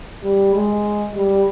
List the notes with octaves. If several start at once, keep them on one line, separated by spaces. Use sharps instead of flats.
G3
G#3
G3